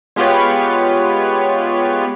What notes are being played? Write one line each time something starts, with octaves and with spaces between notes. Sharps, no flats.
G#3 B3 F4 G4 B4 C#5